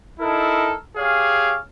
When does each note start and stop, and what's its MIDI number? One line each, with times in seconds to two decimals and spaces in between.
0.20 0.74 63
0.20 0.74 64
0.20 0.74 69
0.20 0.74 70
0.96 1.56 67
0.96 1.56 68
0.96 1.56 73
0.96 1.56 77